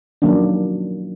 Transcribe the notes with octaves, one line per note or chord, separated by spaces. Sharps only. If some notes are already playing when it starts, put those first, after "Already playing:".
D#3 F3 F#3 A#3 C#4 D4